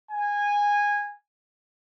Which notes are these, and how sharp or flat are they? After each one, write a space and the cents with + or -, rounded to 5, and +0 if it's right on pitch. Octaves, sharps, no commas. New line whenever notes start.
G#5 -15